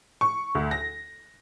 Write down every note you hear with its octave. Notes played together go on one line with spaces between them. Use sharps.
C#6
D2
A#6